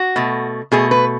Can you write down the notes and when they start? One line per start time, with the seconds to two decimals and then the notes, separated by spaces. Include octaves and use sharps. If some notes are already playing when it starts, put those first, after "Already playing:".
Already playing: F#4
0.16 B2 A3
0.72 B2 A3 G#4
0.91 B4